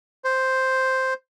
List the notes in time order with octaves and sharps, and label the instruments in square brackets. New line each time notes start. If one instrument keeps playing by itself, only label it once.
[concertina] C5